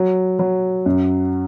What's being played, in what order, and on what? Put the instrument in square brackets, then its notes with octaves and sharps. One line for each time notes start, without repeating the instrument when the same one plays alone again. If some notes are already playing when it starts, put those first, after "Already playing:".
Already playing: [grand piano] F#3
F#3
F#2